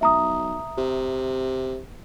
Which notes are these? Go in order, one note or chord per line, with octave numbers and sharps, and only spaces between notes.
B1 E5 A#5 D#6
C3